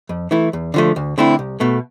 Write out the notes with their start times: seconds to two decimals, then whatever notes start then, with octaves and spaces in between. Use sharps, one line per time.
0.09 F2
0.31 E3 A3 E4
0.53 E2
0.74 D3 F3 A3
0.96 D2
1.18 D3 A3 C4 E4
1.39 C2
1.60 B2 A3